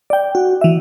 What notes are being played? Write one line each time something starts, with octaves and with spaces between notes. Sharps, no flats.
D5 G5
F#4
E3 E5